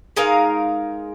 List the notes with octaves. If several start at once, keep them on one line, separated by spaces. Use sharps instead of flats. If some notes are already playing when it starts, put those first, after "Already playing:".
G#3 D#4 A#4 F5